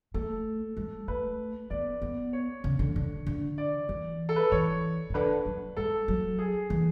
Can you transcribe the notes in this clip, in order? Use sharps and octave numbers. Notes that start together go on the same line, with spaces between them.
A3 A4
G#3
A3 B4
B3 D5
B3
C#5
C#3
D3
D3
D3
D5
E3
A4
B4
E3 C#5
C#3
D3 B4
F#3
G#3 A4
F#3
G#4
E3